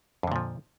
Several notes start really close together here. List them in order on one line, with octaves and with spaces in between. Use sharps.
F2 D3 A#2 F3